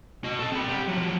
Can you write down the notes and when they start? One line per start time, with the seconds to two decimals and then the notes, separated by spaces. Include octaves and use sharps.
0.24 F#4 D#5
0.39 A4 D#5
0.52 C4 B5
0.68 D3 G4
0.88 F3 F#3